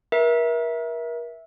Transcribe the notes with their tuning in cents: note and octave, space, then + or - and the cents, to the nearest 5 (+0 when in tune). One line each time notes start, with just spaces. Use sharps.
A#4 +35 E5 -10